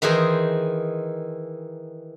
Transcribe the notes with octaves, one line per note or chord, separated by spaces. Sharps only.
D#3 E3 D#4 G#4 C5 D#5